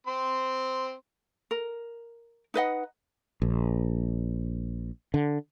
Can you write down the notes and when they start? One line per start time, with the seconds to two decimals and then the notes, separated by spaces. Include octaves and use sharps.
0.07 C4 C6
1.51 A#4
2.54 D#4 B4 D#5 F#5
3.42 A#1
5.14 D3